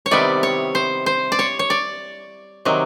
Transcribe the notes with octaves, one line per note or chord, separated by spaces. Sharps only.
C#5
C3 D#3 G3 B3 E4 D5
C#5
C5
C5
D5
C#5
C#5
D5
C3 D#3 F#3